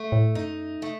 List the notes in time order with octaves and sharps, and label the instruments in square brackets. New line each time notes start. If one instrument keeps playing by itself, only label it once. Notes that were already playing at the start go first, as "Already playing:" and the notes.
Already playing: [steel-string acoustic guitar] A3
[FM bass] A2
[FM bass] F#2 [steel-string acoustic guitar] D#4
[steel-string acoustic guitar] A3